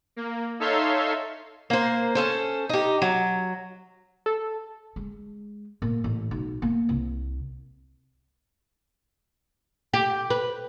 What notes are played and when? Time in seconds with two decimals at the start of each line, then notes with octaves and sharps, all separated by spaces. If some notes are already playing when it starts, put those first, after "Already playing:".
0.16 A#3
0.60 D#4 A4 C#5 E5 F5 C6
1.70 A#3 C5
2.15 C#4 A4 C5
2.69 D#4 G4
3.02 F#3
4.26 A4
4.96 G#3
5.82 A#2
6.04 A1
6.31 B1
6.62 A#3
6.89 C2
9.93 G4
10.30 B4